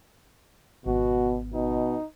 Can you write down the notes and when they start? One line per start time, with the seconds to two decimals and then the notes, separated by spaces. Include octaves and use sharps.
0.86 G#1 B2 B3 F#4
1.54 B2 D#4